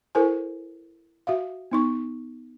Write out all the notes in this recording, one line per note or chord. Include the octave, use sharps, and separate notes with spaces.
E4 A4 A#4 C5 G#5
F#4 E5 F5
B3 D#4 C#6